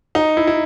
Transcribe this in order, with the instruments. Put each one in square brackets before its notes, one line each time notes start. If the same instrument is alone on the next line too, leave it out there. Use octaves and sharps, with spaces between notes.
[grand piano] D#4
E4
E4